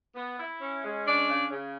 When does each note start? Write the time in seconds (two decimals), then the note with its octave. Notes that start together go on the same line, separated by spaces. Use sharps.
0.15 B3
0.38 E4
0.60 C#4
0.83 G#3
1.05 C#4 D4 D5
1.28 C#3
1.51 C#3